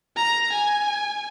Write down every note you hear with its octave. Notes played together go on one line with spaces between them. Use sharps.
A#5
G#5